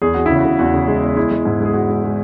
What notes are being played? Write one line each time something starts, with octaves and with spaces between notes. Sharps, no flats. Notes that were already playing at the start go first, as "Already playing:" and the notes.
E2 G#4
E2 F#4
C#3 E4
F#4
C#3
E2 F#4
C#3
G#3
E2
G#3 E4
G#3
G#2
G#3
G#4
G#3 F#4
G#3
G#3